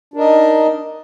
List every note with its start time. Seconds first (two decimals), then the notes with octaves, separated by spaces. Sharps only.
0.14 D4
0.17 A#4
0.19 D#5
0.22 D#4